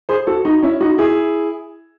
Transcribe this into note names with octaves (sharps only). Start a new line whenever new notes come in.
G#4 C5
F#4 A4
D#4 F#4
C#4 E4
D#4 F#4
E4 G#4